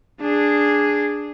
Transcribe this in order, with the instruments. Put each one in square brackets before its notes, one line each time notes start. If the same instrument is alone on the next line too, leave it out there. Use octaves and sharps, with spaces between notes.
[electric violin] D4 G#4